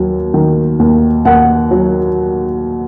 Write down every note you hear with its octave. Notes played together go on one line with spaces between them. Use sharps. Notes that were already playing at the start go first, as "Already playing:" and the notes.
Already playing: D#2 F#3
D#3
D#2
D#2 F#5
F#3